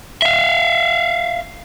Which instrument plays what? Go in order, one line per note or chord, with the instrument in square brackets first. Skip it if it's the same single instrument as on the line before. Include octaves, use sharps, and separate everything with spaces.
[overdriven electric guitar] E5 F5